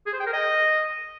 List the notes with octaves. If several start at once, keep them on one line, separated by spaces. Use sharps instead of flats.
G#4
C5
G5
A#4
D#5